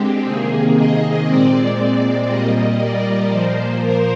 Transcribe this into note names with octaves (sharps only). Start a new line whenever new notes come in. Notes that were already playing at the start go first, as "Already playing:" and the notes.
Already playing: D3 G#3 C4 G4
C3 D#3 A#3 G#4
D#5
A#2 G#3 C4 D5
A#2 G3 A#3 D#5
D5
A#2 F3 A#3 C5
A#4